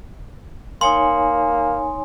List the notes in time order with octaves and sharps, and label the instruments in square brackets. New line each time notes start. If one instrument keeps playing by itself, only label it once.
[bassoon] A#3 [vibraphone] D#4 C#5 G#5 [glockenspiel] C6